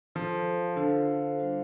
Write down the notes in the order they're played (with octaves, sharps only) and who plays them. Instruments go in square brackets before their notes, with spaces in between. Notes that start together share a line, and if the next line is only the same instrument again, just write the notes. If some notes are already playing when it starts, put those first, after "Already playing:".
[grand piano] F3 [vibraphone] F4 A4 C5 F5
[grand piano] D3 [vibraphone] F4 A4 C5 F5
[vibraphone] G3 D4 F4 C5 F5